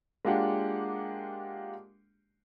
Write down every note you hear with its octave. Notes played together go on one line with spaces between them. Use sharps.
G#3 A#3 D4 F4 G4 F#5